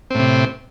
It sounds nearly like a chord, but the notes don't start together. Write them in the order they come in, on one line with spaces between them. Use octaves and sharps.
C4 A2 C3